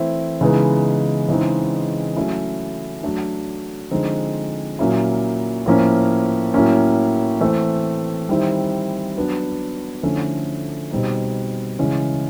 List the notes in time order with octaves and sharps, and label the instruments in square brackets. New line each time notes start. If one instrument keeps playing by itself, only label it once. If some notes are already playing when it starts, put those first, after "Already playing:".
Already playing: [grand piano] E3 A3 C4 E4
C#3 E3 G#3 B3 D#4
C#3 E3 G#3 C4 D#4
F#3 A3 C#4 E4
F#3 A3 D4
D3 F3 G#3 C4 D#4
A#2 F#3 A#3 C#4 E4
A2 F3 A#3 C#4
A2 F#3 A#3 C#4
E3 A3 C4
D#3 G3 C4 E4
F#3 B3 D4
D3 F3 A3 C#4 E4
B2 G3 C4 D#4
C#3 E3 G#3 C#4 E4